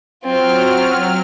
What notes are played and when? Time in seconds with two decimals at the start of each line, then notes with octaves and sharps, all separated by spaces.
0.24 F#3 C4 F4 F6